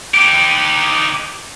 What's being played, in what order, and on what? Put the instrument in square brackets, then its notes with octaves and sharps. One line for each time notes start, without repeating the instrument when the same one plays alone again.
[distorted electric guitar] D#4 G4